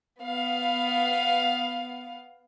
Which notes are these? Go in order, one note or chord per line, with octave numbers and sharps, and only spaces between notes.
B3 F5